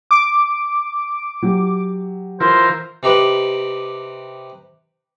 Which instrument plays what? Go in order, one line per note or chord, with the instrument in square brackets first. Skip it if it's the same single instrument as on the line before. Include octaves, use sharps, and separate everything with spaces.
[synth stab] D6
[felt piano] F#3 G4
[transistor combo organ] E3 F4 A#4 [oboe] C5
[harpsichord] C3 D#4 G4 B4